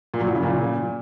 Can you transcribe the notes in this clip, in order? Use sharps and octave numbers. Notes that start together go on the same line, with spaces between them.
A#2
F#3
A2
C#3
A#2